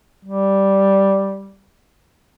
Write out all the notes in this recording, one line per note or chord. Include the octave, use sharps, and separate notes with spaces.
G3